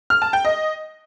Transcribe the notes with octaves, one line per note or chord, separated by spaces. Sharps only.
F6
A5
G5
D#5